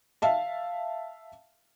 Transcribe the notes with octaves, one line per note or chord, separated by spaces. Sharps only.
E5 F5 A5